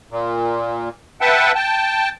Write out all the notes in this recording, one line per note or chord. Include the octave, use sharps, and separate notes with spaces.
A#2
B4 E5 F#5 G5 A5
G5 A5